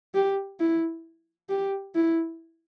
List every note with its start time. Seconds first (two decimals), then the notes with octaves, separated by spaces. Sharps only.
0.15 G4
0.60 E4
1.49 G4
1.95 E4